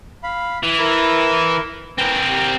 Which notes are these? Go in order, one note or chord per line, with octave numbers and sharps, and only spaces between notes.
F5 B5
E3
E4 A#4 B5
C4 A#4 B4 G#5
G4